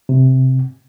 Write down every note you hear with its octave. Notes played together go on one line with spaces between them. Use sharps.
C3